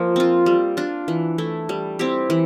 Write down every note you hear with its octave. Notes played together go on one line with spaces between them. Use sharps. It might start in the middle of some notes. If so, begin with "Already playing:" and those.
Already playing: F3 A#3
C4 F4
G3
D4 F4
E3
A3 E4
G3
C4 E4 G4
E3